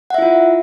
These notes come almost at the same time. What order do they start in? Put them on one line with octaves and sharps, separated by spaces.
F#5 E5 E4 F4